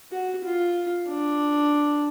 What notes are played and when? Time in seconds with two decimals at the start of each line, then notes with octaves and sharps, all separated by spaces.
0.12 F#4
0.44 F4
1.08 D4